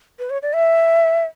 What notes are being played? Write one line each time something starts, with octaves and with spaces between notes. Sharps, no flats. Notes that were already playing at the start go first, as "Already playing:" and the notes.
B4
C#5
D5
E5